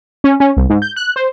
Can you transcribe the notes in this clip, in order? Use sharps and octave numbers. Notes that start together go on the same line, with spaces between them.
C#4
C#4
C2
G#2
G6
F#6
C5